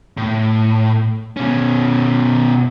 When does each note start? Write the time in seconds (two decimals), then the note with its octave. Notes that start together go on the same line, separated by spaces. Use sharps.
0.17 A2
1.37 B2 C#4